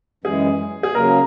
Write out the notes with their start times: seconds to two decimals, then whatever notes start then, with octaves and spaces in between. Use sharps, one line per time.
0.24 F#2 E3 G#3 G#4
0.83 G#4
0.95 C#3 F#3 A#3 A#4